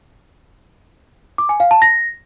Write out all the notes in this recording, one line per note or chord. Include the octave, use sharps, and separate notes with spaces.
D6
G#5
F5
A5
A#6